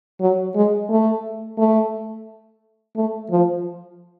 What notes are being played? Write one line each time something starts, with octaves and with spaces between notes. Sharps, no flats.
F#3
G#3
A3
A3
A3
F3